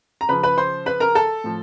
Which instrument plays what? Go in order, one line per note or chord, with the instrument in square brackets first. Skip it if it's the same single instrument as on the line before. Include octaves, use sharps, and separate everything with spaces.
[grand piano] A#5
C#3 F3 B4 B5
B4 B5
C5 C6
B4 B5
A#4 A#5
A4 A5
A2 F3